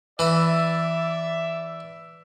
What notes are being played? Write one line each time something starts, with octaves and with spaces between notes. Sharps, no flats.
E3 D5 E5 B5